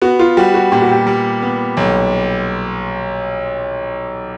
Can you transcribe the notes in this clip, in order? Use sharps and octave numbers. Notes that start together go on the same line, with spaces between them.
B3 F#4
F4
G3 F#4
F#4
A#2 G4
F#4
G4
G3
B3
B1